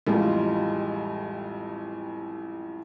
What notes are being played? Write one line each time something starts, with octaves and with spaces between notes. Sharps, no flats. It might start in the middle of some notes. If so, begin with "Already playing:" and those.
A1 F2 G3 G#3 F4